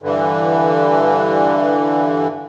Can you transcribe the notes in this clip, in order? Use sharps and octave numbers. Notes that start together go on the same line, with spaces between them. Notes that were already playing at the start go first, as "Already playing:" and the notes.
G2 D3 E3